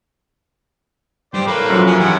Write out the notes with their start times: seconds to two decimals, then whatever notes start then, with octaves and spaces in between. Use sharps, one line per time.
1.34 G2 G4 C5 D5
1.47 A#3 A4 B4 C#5
1.70 F#2 F3
1.87 C#4 G#4
2.00 D#3 E3 E4 G4 F#5